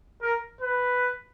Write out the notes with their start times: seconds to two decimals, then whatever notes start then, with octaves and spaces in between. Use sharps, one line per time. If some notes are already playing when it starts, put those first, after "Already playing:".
0.22 A#4
0.61 B4